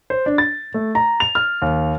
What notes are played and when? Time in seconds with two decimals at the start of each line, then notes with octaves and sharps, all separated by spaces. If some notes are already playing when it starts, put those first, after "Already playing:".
0.10 C5
0.26 D4
0.38 A6
0.74 A3
0.95 A#5
1.20 F7
1.35 F6
1.62 D#2